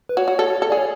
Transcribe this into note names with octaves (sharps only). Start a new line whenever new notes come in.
B4
F#4 C#5
F#4
A4
A4
G#4 D5
C#5